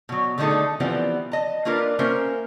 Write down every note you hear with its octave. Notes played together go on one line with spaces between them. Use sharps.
B2 F#3
D3 D#3 A3 D#4 G#4 A4
E3 F3 G3 B3 C4
D#5 A5
A#3 D4 F4 A#4 B4
A#3 C#4 A#4 C5 E5